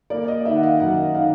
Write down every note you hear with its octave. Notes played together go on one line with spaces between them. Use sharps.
A#3 D5
D#5
D#3 E5
F#5
F5
F#2 F#5
D#3 F5